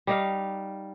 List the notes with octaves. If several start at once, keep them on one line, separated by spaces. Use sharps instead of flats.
G3 D#4 F5